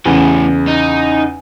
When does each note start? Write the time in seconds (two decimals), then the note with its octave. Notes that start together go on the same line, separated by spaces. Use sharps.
0.06 E2 A2 C#3 E3
0.68 D#4